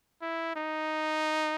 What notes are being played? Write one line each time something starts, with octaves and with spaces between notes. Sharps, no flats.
E4
D#4